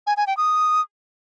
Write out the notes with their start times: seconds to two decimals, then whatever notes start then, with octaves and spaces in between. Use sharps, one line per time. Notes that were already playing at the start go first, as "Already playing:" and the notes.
0.07 G#5
0.17 G#5
0.27 G5
0.37 D#6